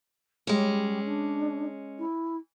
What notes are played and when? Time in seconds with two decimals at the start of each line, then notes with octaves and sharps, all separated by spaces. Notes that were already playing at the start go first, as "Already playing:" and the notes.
0.47 G3 G#3 C#4
1.06 D4
1.99 E4